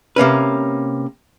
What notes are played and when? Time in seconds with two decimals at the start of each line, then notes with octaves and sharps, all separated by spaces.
0.16 C3 A#3 C#4 B4